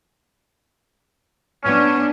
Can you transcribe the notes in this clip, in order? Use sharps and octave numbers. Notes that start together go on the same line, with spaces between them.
B3 C#4 D4